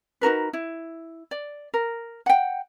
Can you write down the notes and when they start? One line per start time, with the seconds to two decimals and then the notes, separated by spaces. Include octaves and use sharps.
0.21 D#4 F#4 A#4 B4
0.53 E4
1.31 D5
1.74 A#4
2.26 F#5 G5